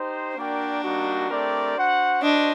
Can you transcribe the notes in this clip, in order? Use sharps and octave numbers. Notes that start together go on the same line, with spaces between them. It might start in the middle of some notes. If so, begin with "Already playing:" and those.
Already playing: D#4 G4 C5
A#3 D4 F#4 A#4 D5 G5
G3 A#3 D#4 F#4
A3 C4 G4 A#4 D5
F#4 C5 F#5
D4 F#4 C5 D#5